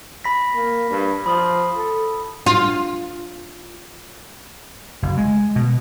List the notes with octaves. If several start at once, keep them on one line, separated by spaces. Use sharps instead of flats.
B5 A#6 B6
A#3
G2
F3 B5 D#6 F#7
A4
F4
F#1
G#3
B2